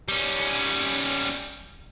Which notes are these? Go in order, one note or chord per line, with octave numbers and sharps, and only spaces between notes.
G3 C#4